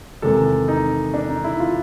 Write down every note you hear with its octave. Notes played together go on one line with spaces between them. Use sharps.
E2 C3 D#3 G#3 A4
D#4
D4
D#4
E4
F4